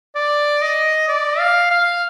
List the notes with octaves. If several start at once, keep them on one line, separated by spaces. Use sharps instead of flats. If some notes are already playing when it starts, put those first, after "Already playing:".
D5
D#5
D5
F5
F5